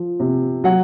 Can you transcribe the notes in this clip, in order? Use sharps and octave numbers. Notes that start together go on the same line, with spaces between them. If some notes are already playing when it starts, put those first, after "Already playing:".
Already playing: F3
C3
F#3 F#5